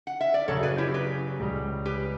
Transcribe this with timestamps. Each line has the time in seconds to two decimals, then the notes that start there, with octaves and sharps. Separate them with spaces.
0.07 F#5
0.21 E5
0.34 D5
0.48 F#2 C#3 F#3 A4 C#5
0.63 B4 D5
0.78 E4 G4
0.94 G4 B4
1.39 C#2 C#3 G3
1.86 G4 B4